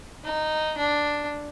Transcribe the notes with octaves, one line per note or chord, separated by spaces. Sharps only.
D#4
D4